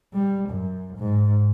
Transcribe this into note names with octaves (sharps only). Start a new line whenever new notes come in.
G3
F#2
G#2